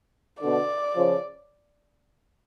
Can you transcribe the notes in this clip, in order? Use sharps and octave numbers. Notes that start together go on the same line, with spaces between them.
B2 D3 D5
C#3 F3